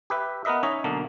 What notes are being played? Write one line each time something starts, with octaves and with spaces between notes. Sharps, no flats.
G4 B4 E5
B3 A#4 B4 D#5 E5
C#4 D#4 C#5 D#5 E5
B1 D3 A#3